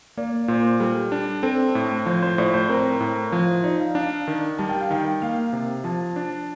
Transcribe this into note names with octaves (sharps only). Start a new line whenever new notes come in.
A#3 D5
A#2 C5
G3 A4
D4
C4 A4
A2
F3 C5
C5
A2 D5
C5
C4 A#4
A2
F3 C5
C5
D#4 D5
F5
D4 F5
D#3
G3 A5
G5
F5
D#3 G5
A#3 F5
C3
F3 A5
D4